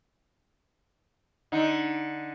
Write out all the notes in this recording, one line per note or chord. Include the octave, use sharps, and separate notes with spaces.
D3 D#4